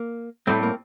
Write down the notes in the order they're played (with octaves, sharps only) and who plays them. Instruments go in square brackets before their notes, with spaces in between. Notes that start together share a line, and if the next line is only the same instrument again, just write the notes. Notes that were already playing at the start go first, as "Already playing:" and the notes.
Already playing: [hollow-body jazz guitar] A#3
[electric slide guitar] A2 G3 C4 [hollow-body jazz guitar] A3
[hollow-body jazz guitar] A#3